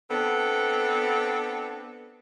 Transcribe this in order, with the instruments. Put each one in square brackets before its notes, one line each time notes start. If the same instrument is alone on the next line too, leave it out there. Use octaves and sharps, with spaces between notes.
[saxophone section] B3 C4 D4 A4